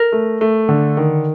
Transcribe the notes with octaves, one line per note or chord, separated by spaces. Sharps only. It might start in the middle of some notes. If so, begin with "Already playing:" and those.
Already playing: A#4
A3
A3
D3
D#3